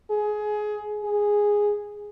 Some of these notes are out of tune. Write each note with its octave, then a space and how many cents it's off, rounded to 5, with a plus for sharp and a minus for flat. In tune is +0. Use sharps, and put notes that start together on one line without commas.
G#4 +20
G#4 -5